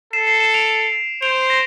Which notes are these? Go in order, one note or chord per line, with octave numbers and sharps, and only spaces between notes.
A4 C7 E7
C7 E7
C7 E7
D7 F7
C5 D7 F7
C7
A#6 D7